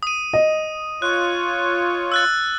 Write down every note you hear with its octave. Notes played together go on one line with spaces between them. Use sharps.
D#6 D#7
D#5
F4 C#5 F#6
E6 F#6 A6